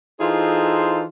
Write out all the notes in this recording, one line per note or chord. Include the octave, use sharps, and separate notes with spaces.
E3 D#4 F4 G#4 A4 C5